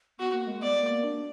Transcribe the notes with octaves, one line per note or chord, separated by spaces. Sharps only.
B3 F#4
A#3
G#3
B3 D5
A#3
D4